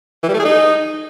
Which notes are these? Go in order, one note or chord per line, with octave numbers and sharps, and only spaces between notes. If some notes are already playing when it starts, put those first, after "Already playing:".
E3
G3
A3
G#4
D#4